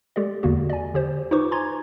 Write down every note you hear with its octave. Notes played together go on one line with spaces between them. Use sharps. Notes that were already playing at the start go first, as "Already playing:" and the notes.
G#3 G4 A4 D5
E2 D3 A#3 F#4
D5 G#5
D3 G4 C5
D#4 F4 B4 C5 C#6 D6
G#5 A#5 C6 G#6